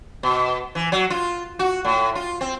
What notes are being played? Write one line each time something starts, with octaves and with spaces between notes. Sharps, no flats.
B2
E3
F#3
F4
F#4
A2
F4
C4